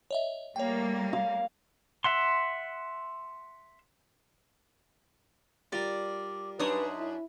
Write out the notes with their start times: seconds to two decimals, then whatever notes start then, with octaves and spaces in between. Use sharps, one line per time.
0.11 C#5 D#5 E5
0.56 G3 A3 A#3 C#5 G5
1.13 F5
2.04 E5 F#5 C6
5.72 G3 F4 A#4 D5
6.59 F#2 D4 D#4 B4 C#5 D#6
6.98 E4